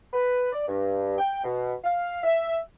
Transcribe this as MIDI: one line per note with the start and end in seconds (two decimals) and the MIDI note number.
0.13 0.51 71
0.52 0.65 74
0.67 1.16 43
1.19 1.42 79
1.44 1.73 47
1.84 2.22 77
2.24 2.58 76